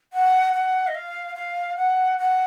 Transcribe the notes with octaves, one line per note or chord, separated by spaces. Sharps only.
F#5
F#5
D#5
F5
F5
F#5
F#5